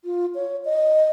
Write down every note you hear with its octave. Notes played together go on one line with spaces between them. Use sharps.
F4
C#5
D#5